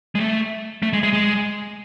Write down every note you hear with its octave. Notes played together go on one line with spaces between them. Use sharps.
G#3
A3
A3
G#3
G#3
G#3